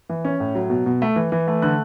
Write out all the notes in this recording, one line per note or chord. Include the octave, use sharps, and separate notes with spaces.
E3
C#4
A2
F#3
B2
B2
A3
E3
E3
A3
D3 F#6